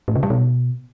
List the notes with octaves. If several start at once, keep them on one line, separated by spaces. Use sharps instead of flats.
A2
C#3
G3
B2